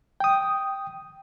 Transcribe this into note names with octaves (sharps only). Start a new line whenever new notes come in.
G5 D#6